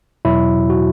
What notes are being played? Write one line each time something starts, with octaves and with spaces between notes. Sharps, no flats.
E2 B2 F#3 E4
F#4